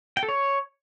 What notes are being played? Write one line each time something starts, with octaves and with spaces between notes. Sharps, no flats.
G5
A4
C#5